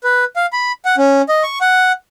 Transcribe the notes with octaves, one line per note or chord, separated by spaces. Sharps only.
B4
F5
B5
F#5
C#4
D#5
C#6
F#5